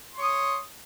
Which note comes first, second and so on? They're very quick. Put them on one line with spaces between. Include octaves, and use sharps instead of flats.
C6 C#5 D#6